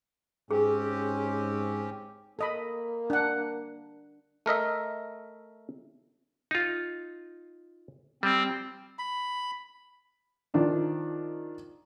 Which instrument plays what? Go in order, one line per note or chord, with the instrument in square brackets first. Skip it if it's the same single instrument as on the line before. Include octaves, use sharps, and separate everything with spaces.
[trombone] G#2 [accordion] C4 C#4 G4 [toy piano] G#4
[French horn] A#3 [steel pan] A4 D#5 B5
[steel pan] D4 F#5
[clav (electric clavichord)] A3 A#4 D#5 E5
D#4 F4
[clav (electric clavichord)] G3 [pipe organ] C4
[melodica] B5
[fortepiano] D#3 F3 D4 F4